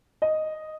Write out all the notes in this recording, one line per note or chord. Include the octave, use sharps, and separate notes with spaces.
D#5